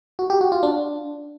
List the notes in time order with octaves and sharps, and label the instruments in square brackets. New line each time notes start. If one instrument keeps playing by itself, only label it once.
[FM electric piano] F#4
G4
F#4
F4
D4